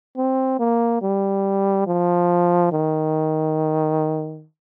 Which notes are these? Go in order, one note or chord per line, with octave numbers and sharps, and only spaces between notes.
C4
A#3
G3
F3
D#3